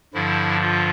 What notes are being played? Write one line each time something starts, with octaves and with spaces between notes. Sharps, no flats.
G2 D3 F3 E4
F4